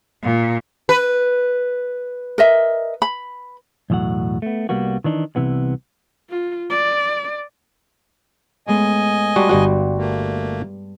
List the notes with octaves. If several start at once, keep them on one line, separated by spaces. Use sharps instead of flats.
A#2
B4
A#4 D#5 E5
B5
B1 E2 A2 F#3 F#5
A3 B3
C2 G3 A#3 B3 F#4
D#3 E3 D4 D#4
C2 C3 E3 B3
F4
D5
A2 G#3 B3 D#5 G#5
G3 F#4 A5 C6
G1 G2 G3 F#4
A3 A#3